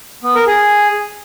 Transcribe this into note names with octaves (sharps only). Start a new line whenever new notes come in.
B3
A#4
G#4